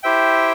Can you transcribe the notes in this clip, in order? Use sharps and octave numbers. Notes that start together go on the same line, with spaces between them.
E4 G4 C5 E5 G5